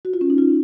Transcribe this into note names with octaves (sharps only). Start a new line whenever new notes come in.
F#4
F4
C#4
D#4
F4